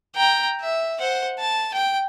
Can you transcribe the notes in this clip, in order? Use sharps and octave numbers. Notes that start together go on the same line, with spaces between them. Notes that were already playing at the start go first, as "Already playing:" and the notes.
G5 A#5
E5
C5 F#5
A5
G5